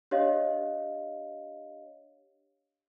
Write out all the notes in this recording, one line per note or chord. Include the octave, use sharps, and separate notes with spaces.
D4 G4 C#5 D#5 F5